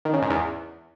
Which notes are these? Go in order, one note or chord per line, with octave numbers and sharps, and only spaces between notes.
D#3
C#3
G#2
E2